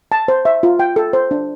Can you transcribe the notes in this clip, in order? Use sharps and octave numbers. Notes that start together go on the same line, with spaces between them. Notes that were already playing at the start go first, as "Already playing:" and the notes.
A5
C5
E5
F4
G5
A4
C5
D4